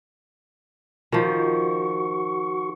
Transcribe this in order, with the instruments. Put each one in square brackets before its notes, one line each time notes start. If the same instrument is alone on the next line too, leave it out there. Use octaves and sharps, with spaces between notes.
[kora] D#3 F3 [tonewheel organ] F#4 C#6